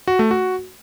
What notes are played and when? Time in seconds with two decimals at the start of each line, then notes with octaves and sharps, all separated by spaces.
0.08 F#4
0.19 A3
0.31 F#4